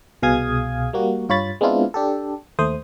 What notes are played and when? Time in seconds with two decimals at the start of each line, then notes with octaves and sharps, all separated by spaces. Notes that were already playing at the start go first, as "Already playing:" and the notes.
0.22 C2 B2 G#4 F5 D#6 G#6
0.93 G3 A#3 F#4
1.29 G2 F4 C#5 B5 A6
1.61 G#3 B3 C4 D4 E4 F4
1.94 D4 G4 A4
2.59 D#2 A3 C5 D#6